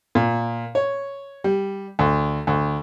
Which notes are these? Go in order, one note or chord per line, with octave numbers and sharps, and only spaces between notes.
A#2
C#5
G3
D2
D2